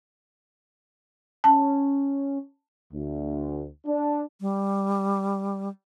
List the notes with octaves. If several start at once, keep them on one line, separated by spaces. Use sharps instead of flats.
C#4 A5
D2
D4
G3